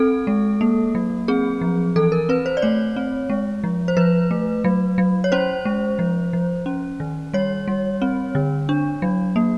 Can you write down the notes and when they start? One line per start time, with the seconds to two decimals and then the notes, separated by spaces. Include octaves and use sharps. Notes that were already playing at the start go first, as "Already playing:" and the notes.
Already playing: C4 A4
0.27 G#3
0.61 A#3
0.95 F#3
1.28 C4 G#4
1.61 F3
1.96 E3 A4
2.12 A#4
2.29 C4 B4
2.46 C5
2.57 D5
2.62 A3 C#5
2.96 C4
3.30 G#3
3.64 F3
3.88 C5
3.97 F3 B4
4.31 A3
4.64 F#3
4.98 F#3
5.24 C#5
5.32 C#4 C5
5.65 G#3
5.99 F3
6.33 F3
6.66 C#4
7.00 D#3
7.33 G3 C#5
7.68 G3
8.02 C4
8.35 D3
8.69 D4
9.02 F#3
9.36 A#3